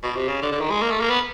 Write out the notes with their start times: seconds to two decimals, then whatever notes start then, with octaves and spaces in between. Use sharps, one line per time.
0.03 B2
0.16 C3
0.28 C#3
0.42 D3
0.52 D3
0.61 D#3
0.71 G#3
0.82 A#3
0.91 A3
1.01 A#3
1.10 B3